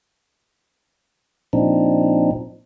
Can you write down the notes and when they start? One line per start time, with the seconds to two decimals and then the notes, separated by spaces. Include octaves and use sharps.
1.53 A#2 F3 C4 D4 D#4